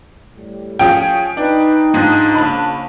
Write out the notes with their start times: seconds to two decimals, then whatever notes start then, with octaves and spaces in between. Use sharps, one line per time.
0.36 A2 G3
0.79 F3 C#4 G#4 G5
1.37 D4 D#4 B4
1.94 G#2 F3 G#3 D4
2.35 A#1 C#3 A5 B5